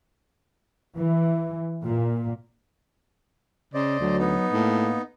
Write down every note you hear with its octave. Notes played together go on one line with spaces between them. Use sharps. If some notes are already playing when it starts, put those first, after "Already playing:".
E3
A#2
C#3 C5 D5 D#5
D2 F#3
B3 D#4
A2 A#3